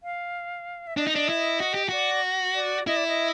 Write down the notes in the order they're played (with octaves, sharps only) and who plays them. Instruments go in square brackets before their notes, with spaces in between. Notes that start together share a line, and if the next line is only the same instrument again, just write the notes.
[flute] F5
E5
[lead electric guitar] D4 [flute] D#5
[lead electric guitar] D#4
D4
E4
F#4
G4
[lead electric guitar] F#4 [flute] D5
[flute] D5
[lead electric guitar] E4 [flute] D#5
[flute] D5
D#5